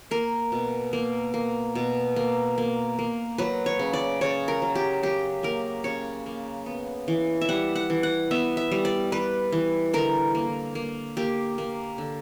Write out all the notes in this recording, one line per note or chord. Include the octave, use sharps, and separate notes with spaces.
A#3 A#4
B2
A#3
A#3
B2
A#3
A#3
A#3
F#3 B4
C#5
C#3
D5
C#3 C#5
A#4
F#3
G4
F#3 G4
A#3 A#4
C#3 C#5
A#3
B3
E3
E5
G3 F#5
F#5
E3
F#5
B3 E5
E5
G3
D5
G3 B4
E3
D3 A#4
A#3
A#3
A#3 G4
A#3
D3